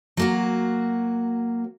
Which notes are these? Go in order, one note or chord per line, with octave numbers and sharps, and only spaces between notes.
F#3 A#3 F#4